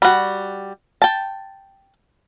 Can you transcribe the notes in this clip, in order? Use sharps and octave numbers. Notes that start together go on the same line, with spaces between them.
G3 F#4
G5 A5